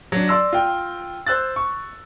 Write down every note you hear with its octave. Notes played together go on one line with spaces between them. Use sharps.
F#3 D4
D5 C6 E6 A#6
F4 G5
C5 E6 F#6 A6
C#6